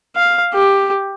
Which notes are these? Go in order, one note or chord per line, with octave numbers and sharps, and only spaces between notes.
F5
G4